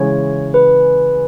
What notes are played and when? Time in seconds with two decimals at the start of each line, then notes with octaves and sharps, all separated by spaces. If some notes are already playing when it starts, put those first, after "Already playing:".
Already playing: C#3 E3 G#3 C#5
0.54 B4